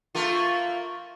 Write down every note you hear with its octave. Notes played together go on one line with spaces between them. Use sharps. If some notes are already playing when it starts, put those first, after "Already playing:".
A3 A#3 F4